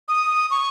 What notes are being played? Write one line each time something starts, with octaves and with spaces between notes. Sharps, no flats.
D#6
C#6